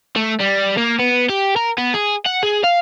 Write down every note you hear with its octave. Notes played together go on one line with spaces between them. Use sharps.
A3
G3
A#3
B3
G4
A#4
B3
G#4
F#5
G#4
F5